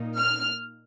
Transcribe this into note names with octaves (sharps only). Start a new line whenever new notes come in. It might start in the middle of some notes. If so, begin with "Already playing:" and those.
Already playing: A#2 A#3 D#4
F6